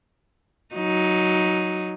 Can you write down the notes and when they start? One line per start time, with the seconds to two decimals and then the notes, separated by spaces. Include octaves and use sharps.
0.75 F#3 D#4